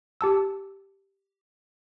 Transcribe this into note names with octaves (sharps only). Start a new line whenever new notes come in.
G4 A5 E6